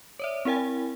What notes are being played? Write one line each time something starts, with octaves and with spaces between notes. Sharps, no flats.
C#5 D5 E5
C4 E4 A#4 G5 G#5